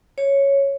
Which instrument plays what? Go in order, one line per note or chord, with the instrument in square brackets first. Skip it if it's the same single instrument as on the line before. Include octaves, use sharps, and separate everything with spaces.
[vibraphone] C#5